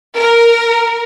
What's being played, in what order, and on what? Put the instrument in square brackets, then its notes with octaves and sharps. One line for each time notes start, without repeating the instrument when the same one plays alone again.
[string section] A#4